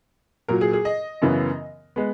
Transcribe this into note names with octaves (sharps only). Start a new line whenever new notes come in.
A#2 F#3 A#3 A#4
G#4
G#4
D#5
F#2 C#3 E3 B3
G#3 B3